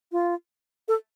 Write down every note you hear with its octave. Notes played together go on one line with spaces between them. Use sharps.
F4
A4